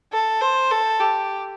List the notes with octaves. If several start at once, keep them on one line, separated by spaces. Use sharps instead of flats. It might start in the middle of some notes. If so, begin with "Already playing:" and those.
A4
C5
A4
G4